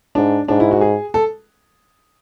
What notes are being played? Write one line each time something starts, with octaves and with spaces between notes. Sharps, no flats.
G#2 D4
G#2 D4
E4
F#4
G#4
A4